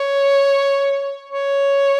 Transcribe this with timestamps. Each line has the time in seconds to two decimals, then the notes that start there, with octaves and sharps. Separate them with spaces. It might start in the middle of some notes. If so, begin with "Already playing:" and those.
Already playing: C#5
1.30 C#5